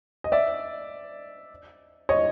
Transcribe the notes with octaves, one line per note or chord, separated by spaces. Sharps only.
D#5
D5 E5
C#5 D#5